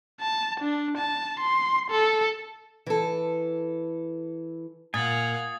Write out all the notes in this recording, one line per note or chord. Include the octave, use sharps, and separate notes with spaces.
A5
D4
A5
C6
A4
E3 A4
A#2 F5 F#5 G#5 D#6 A6